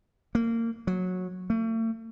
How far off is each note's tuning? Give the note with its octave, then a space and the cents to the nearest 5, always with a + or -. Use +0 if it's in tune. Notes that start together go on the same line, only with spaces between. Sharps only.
A#3 -25
F#3 -15
A3 +40